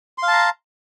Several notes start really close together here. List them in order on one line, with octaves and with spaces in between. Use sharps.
C6 F5 A5 A#5